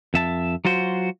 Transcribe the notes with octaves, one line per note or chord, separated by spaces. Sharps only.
F2 E5 A5
F#3 F4 F#4 C5